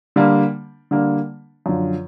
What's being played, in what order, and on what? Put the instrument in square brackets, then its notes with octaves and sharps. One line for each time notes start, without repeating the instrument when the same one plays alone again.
[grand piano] D3 G3 A#3 D4
D3 G3 A#3 D4
F#2 D3 F3